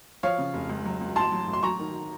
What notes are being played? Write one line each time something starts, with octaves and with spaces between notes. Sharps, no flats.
F3 C#5 F5
C#3
F1
C#2
F#3
C#2
A1 A5 C6
F#3
A1
C6
F#3 A#5 C#6
D#3